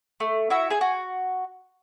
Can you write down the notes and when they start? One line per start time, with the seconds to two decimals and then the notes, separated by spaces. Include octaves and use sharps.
0.20 A3
0.50 E4 F#4 E5
0.70 G#4 G#5
0.81 F#4